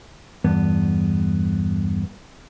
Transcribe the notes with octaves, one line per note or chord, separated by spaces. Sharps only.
E2 G2 B3